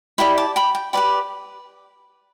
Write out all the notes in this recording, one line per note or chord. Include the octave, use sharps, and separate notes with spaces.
E4 G4 D5 G5 B5
A5 D6
G5 B5
G5
G4 B4 D5 G5 B5